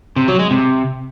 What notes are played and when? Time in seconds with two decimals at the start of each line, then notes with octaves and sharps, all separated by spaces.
0.16 C3
0.28 F#3
0.39 G#3
0.51 C3